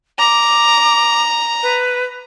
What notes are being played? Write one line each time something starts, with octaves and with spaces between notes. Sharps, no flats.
A#5 D6
B4